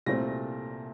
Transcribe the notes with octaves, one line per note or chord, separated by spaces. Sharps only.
C2 A#2 A3 C4 A#6